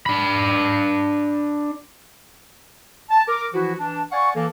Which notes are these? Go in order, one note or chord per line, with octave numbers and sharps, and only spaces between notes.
D4 B5
A5
A#4 D6
E3 F3 E4 F#4
E3 D4 A5
D5 F5 F#5 G#5 C#6
E3 A#3 A4